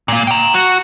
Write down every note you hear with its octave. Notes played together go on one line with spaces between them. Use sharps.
A#2 A#3
G5 A#5
F#4